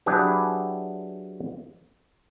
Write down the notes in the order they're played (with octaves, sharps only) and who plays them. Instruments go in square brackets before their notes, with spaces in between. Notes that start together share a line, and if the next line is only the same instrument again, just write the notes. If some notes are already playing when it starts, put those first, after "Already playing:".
[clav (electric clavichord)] F#3 D4 E4 G4 G#4 B4